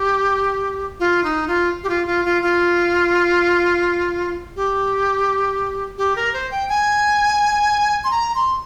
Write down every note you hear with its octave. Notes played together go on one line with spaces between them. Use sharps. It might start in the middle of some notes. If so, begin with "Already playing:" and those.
Already playing: G4
F4
D#4
F4
G4
F4
F4
F4
F4
G4
G4
A#4
C5
G5
G#5
C6
A#5
C6